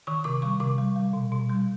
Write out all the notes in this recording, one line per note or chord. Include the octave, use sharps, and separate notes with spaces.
D#3 C#6
C3 D6
G3 C#6
C3 D6
G3
G3
B2
B2
G3